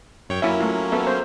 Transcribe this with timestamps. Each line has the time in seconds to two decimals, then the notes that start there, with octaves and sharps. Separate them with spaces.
0.29 F#2 C#5 G5
0.42 F#3 A#3 C#4 E4 E5
0.60 A3 F4
0.92 B3 A4 E5
1.07 C5